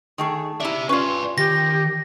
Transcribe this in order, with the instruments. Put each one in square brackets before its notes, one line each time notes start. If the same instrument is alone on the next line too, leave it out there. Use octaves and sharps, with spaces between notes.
[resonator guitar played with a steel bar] D#3 A3 G#4
[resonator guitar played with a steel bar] E4 D5 [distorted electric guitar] G4 E5
[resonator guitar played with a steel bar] C#4 F4 [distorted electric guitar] B4 D5
[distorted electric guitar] D#3 [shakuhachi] G4 [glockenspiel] A#6